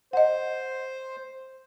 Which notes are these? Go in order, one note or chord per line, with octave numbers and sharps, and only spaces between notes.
C5 D#5 F#5